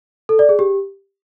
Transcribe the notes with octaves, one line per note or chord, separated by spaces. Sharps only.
A4
D5
G#4
G4